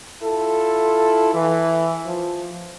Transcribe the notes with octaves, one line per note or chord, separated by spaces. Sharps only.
E4 F4 A4
E3
F3